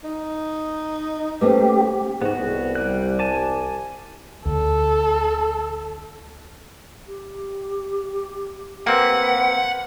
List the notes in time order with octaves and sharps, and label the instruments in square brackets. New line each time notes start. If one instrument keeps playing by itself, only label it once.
[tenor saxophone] D#4
[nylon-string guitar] A3 A#3 C#4 [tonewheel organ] G4 [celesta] B4 C5
[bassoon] G#2 [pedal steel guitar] B3 F#4
[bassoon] C2
[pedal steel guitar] G3 F#6
G#5 A5 D6
[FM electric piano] D2 [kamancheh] A4
[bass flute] G4
[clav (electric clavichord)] A#3 C4 [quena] B4 [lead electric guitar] F#5